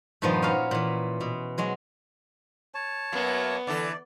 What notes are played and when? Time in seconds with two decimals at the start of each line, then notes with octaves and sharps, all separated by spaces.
0.22 G2 A#2 D#3 F3 B3 D#4
0.42 C#4 E4 F#4 A#4 F5
0.71 A#2 E3
1.21 B2
1.58 F#3 G#3 F#4
2.74 C#5 A5
3.12 F#2 F#3 A#3 B3
3.67 D3 E3 A4 D5